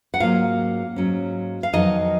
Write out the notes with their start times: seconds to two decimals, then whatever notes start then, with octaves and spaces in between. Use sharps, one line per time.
0.14 F#5
0.20 G#2 F#3 A#3 C#4 F4 F5
0.96 G#2 F#3 C#4
1.63 F5
1.73 F2 D#3 F#3 B3 D#4 D#5